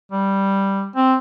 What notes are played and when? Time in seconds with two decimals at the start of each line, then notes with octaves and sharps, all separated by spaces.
0.12 G3
0.96 C4